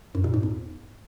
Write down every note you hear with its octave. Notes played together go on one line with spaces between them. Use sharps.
F#2
A#2
G#2
E2